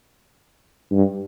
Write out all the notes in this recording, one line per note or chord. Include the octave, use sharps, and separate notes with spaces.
G2